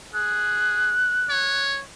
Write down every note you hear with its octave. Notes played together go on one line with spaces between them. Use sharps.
G#4 F#6
C#5